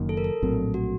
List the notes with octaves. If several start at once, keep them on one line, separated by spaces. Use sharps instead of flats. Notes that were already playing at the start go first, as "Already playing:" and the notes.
Already playing: F#1 F#2 D#3 A#3
A4
A#4
A4
A#1 A2 F#3 C4
F#4